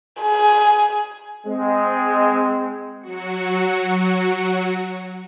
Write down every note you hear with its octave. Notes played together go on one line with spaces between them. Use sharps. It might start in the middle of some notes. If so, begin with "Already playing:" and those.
G#4
G#3 C4
F#3 F#4 C#7